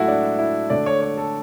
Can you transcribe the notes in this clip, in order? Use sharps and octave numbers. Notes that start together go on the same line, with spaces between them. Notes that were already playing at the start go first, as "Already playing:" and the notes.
Already playing: A2 F#3 A3 E4 F#4 A4
D4
E4
D3 A3 D4 D5
C#5
C#5
A4